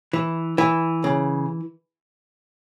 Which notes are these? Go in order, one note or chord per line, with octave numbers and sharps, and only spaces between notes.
E3
E3
C#3